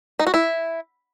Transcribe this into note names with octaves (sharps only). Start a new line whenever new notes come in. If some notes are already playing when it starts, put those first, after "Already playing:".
D#4
F#4
E4